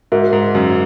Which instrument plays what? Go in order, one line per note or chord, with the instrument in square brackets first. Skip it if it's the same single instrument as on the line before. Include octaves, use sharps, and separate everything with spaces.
[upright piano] G#2 [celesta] F#4 A#4 E5
[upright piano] G#2
F#2